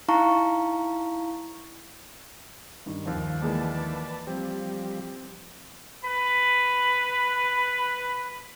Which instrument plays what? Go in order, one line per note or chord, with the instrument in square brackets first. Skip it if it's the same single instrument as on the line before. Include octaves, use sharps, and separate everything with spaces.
[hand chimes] D#4 E4 F5 A5 A#5 C#6
[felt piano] G2 D#3
[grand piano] D#2 F3
[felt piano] E3 G#3 A#3 [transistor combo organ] B4 D5 A5
[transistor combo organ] F3 G3 G4 [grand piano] C4
[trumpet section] B4 B5